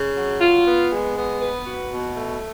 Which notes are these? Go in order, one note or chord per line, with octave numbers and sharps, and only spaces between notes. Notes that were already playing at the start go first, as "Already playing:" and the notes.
Already playing: C#3
F#3
F4
B3
G#3
B3
B4
F#4
B2
A3